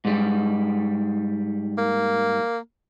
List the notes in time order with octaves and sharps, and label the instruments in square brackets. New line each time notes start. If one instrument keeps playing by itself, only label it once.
[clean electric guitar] G#2 G3
[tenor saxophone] A#3